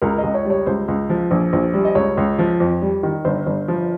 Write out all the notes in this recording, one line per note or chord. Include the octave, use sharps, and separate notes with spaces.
C#2 A#4
C#2 D#5
C#5
G3 C#5
C#2 C5
C#2
F3
A#1
A#1
G3
D#5
C#2 C#5
C#2
F3
F2
G3
D#3
G1 C5
G1
F3